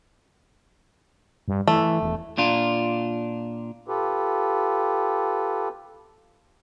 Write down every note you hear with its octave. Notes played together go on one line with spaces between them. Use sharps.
G2
E3 A3
E1
A#2 D4 F4
F4 G4 A4 B4